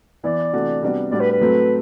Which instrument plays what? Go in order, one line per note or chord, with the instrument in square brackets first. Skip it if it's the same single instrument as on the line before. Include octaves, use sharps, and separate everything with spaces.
[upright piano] E3 B3 E4 [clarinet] D5
[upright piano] C3 E3 A3 D4 F#4
C3 G3 B3 D4 F#4
[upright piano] A2 G3 D4 F#4 [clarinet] D5
[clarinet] B4
B4
[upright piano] A2 F#3 A3 C4